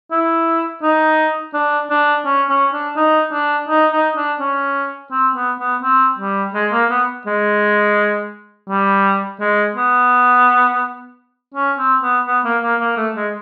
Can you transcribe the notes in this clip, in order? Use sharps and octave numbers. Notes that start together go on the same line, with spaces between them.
E4
D#4
D4
D4
C#4
C#4
D4
D#4
D4
D#4
D#4
D4
C#4
C4
B3
B3
C4
G3
G#3
A#3
B3
G#3
G3
G#3
B3
C#4
C4
B3
B3
A#3
A#3
A#3
A3
G#3